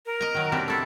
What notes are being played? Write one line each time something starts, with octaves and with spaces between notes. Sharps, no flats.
A#4
D#5 A#5
D#3 F#3
C3 G3 D4
A3 E4 A4